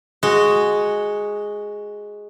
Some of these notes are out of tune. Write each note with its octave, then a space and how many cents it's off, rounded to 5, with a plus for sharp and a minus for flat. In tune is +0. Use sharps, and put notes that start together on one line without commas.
G#3 +0 F#4 +0